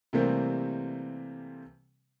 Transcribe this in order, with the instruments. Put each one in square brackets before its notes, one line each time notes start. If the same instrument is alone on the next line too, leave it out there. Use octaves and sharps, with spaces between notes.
[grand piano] C3 E3 G3 A3 A#3 C4